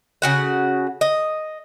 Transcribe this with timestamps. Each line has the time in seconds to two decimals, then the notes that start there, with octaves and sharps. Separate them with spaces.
0.22 C#3 F#4 F#5
1.01 D#5